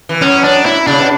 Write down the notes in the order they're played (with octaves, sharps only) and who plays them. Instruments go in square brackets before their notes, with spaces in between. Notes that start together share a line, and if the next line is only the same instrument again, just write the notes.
[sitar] E3
[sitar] F#2 [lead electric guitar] C#4
[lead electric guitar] D4
E4
[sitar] C#3 [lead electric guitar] D4
[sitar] B2